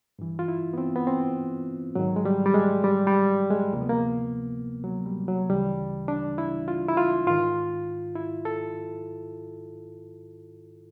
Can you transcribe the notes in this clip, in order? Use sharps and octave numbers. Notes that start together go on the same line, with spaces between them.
G2 E3
F4
E4
B3
C4
B3
C4
G#2 D#3 F#3
G#3
G3
G3
G#3
G3
G3
G#3
D2 C3 F3 A#3
B3
A#3
F#3
G3
F#3
D2 C#3 E3 G3
D4
E4
F4
E4
F4
G#2 D#3 F4
E4
A4